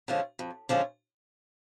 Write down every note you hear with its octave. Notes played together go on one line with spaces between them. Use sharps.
D3 F3 G#3 C#4
F2
D3 F3 G#3 C#4